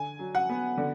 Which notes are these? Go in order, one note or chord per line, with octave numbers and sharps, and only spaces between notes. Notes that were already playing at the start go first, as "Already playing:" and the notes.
Already playing: D3 G#5
F#3
F#5
B3
D3